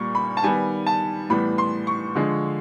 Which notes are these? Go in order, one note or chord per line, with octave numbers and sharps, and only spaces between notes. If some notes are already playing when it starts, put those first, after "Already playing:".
Already playing: A#2 G3 A#3 C#6
B5
A5
D#3 G3 B3 G#5
A5
A2 E3 G3 B3 B5
C6
C#6
D3 F3 G#3